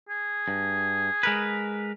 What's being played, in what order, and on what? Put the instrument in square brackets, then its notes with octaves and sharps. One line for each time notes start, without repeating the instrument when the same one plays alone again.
[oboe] G#4
[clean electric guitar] G2
G#3 A#4 B4